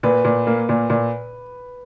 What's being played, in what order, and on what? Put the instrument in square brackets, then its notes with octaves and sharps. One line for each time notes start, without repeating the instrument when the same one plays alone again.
[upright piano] A#2 [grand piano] B4
[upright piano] A#2
A#3
A#2
A#2